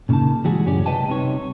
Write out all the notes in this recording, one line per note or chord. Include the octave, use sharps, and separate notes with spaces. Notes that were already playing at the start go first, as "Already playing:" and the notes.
A#2 C#3 A#3 D#4 A5
E3 G3 G#3 F#4 G#4
C#2 F#2 A2 C#4 G4 D5
C3 G3 B4 D#5 G5 A5
C2 C3 A#3 D#4 C#5